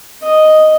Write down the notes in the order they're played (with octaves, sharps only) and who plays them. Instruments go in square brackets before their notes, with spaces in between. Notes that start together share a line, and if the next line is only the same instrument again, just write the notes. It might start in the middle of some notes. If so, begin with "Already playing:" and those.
[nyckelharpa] D#5